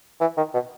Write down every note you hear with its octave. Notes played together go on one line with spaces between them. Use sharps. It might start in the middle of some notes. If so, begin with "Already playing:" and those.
E3
D#3
B2